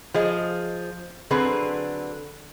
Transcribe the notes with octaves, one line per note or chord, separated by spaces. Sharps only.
F3 G#4 D#5
D3 F#3 C4 G#4 B4